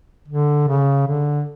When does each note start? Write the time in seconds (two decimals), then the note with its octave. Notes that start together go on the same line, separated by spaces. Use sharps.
0.29 D3
0.68 C#3
1.08 D3